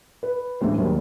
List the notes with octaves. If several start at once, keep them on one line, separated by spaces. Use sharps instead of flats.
B4
D2 A2 E3 G#3 C5
D#2 D#3 F#3 G3